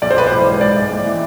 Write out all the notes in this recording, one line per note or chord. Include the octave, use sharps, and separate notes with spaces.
B1 D5
C5
B1 B4
A1 C5
G#2
G#2 D5
G#2
A1
E3